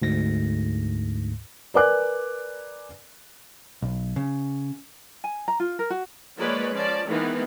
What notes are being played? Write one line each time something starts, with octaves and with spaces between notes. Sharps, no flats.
D2 G#2 A#6
A#4 B4 D5 G#5 D6 F#6
B1
C#3
G#5
A#5
F4
A#4
F#4
F3 G#3 A#3 B4 C#5 D5
F3 C#4 D5 A5
D#3 E3 G#3 A#3 B3 D#4